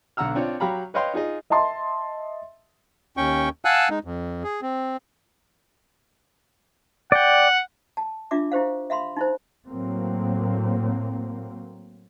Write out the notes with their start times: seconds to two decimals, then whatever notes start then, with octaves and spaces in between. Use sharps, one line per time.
0.17 B1 D3 F#5 A#5 E6 F6
0.35 C4 D4 F4 C#5
0.60 F#3 G4 F5 A#5 B5
0.94 B4 C#5 D#5 F5 G5 C6
1.14 D#4 F4 G#4 D#5
1.50 D#5 E5 A5 C6
3.17 D#2 C#4 G5 C#6
3.65 F5 F#5 G#5 A5 E6 F#6
3.90 G#3 D#4
4.04 F2
4.44 G#4
4.62 C4
7.12 D5 F#5 G5
7.97 A5
8.31 D4 F4 E5 D6
8.52 E4 G4 C5 F5
8.90 E5 F5 B5 C6
9.17 D#4 E4 C5
9.67 A2 F#3 A#3 C4